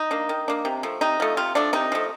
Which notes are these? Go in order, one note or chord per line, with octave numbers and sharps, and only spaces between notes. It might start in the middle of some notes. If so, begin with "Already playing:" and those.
Already playing: D#4
A#3 D4
D#3
A#3 D4
C3
F3 A3
C3 D#4
F3 A3
C3 F4
F3 A3 D4
C3 D#4
F3 A3